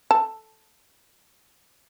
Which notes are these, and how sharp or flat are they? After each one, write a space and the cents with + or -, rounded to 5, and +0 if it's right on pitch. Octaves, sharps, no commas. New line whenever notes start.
A4 +0 A5 +0